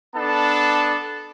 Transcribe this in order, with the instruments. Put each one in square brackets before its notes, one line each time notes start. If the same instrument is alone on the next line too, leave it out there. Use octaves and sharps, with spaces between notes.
[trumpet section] B3 D4 A4 A5